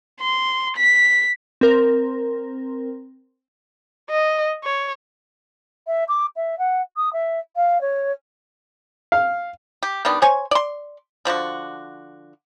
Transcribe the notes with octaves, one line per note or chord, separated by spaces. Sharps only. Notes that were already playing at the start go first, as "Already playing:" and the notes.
C6
B6
C4 A#4
D#5
C#5
E5
D6
E5
F#5
D#6
E5
F5
C#5
F5
G4
D#3 G3 B3 D4
C5 C#5 G#5 C#6
D5 C6
D3 F3 D4 F#4